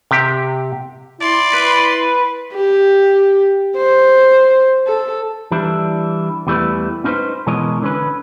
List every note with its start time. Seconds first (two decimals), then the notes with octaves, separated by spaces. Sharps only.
0.11 C3 G4
1.21 E4 D5 C6
1.54 B4
2.53 G4
3.76 C5
4.87 A4
5.51 E3 G3 D4 E4
6.47 E2 E3 G3 A3 E4 B4
7.04 C#4 D#4 E4 G4 B4 C5
7.47 B2 E3 G#3 A#4 C#5 D#5
7.82 D3 C#4 B4